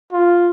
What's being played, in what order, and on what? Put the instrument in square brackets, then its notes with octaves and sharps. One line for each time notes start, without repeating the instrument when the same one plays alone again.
[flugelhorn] F4